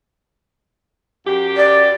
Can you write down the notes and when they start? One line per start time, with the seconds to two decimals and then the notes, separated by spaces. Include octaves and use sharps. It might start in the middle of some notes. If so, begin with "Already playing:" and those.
1.26 F#2 G4
1.57 D5